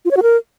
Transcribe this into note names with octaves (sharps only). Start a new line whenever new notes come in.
F4
C#5
F#4
A#4